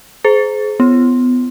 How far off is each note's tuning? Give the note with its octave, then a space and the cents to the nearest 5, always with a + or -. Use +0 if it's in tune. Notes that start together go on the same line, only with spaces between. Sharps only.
G#4 +30 C5 -15
B3 +25 F4 -40